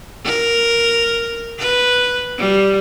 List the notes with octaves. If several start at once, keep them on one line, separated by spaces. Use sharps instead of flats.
A#4
B4
G3